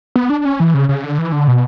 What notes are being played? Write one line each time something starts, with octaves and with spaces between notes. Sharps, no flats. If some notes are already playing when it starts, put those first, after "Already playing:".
B3
D4
C#4
E3
C#3
C#3
D3
E3
D3
B2